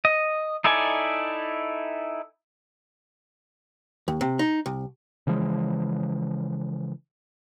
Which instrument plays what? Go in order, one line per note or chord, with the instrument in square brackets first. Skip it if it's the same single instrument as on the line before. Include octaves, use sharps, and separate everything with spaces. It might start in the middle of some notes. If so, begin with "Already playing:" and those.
[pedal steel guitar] D#5
D#4 E4 A4 D5 G#5
[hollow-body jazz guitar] D#2
C3
D#4
C2
[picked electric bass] C#3 E3 F3 G#3